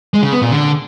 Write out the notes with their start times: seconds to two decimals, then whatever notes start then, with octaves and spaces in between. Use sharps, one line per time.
0.14 G#3
0.23 C#3
0.32 B3
0.42 A#2
0.51 D3